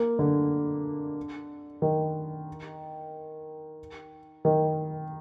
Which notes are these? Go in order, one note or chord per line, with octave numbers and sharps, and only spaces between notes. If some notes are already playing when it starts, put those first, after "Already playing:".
Already playing: A#3
D3
D#3
D#3